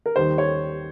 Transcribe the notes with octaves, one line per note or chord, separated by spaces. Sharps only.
A#4
D#2 D#3 G3 C5
C#5